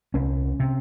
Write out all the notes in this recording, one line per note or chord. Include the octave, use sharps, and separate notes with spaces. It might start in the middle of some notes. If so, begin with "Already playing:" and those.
C2 C#4
C3